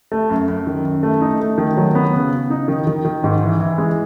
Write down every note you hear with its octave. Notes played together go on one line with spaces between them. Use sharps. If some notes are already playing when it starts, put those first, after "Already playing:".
A3
F#2
F#2
D#3
F#2
A3
D#4
A3
D#3
F#3
B3
C#3
C#3
D#4
D#3
D#3
D#3
G#2
E3
E3
G#3